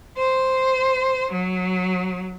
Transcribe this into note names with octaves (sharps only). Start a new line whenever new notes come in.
C5
F#3